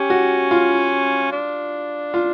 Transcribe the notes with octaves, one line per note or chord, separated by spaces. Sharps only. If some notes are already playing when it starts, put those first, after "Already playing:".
Already playing: C#4 G4
F#4
F4
D4
F4